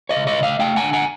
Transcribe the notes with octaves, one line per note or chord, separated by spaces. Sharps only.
C#5 D#5
C#3
C#5 D#5
C#3
D#5 F5
A3 F5 G5
F#5 G#5
D3
F#5 G#5